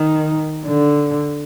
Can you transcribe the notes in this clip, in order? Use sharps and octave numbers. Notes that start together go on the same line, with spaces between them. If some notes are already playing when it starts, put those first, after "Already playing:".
Already playing: D#3
D3